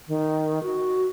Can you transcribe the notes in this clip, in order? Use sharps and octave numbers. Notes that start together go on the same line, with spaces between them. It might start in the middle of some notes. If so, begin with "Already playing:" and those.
D#3
F#4